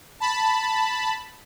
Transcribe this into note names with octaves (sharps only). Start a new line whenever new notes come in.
A5 B5